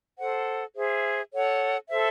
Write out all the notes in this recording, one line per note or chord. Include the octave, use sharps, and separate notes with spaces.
A4 C5 F#5
G#4 C5 E5
A4 C#5 F#5
A4 C5 E5